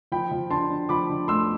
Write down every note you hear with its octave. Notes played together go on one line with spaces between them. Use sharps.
F3 G5 B5
F3
D3 A5 C6
D3
F3 B5 D6
D3
A3 C6 E6